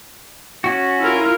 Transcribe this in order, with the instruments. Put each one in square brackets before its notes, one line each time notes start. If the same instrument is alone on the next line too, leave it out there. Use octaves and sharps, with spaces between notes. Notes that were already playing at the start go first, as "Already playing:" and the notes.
[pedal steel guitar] C#4 F#4
[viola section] E4 F4 A#4